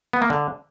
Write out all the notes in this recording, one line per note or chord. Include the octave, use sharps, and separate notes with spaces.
B3
A#3
D3